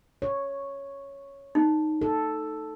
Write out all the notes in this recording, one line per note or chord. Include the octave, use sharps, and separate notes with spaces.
C#5
D#4
A4